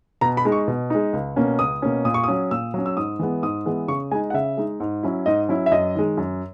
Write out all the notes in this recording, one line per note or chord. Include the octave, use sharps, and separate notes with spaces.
B2 A#5
B5
G#3 D#4
C#6
B2
G#3 D#4
C#2
B2 A#3 C#4
C#2 D#6
B2 A#3 C#4
A#2 D#6
C#6
D#6
F#3 C#4
A#2 E6
F#3 C#4
E6
G#2 D#6
E3 G#3 B3
G#2 D#6
E3 G#3 B3
C#3 C#6
G#3 D#4 G#5
F#5
C#3 E5
G#3 D#4
G#2
F#3 C#4 E4
G#2 D#5
F#3 C#4 E4
E5
F#2 D#5
D#3 G#3
F#2